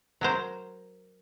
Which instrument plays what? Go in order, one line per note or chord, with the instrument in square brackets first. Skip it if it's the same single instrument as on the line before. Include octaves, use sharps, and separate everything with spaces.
[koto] F#3 A#4 C5